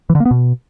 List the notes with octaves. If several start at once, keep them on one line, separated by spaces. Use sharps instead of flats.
E3
D3
A#3
B3
B2